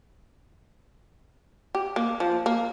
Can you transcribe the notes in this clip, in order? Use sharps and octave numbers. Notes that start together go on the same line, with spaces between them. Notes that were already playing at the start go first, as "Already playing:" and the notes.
G4
A#3
F3
A#3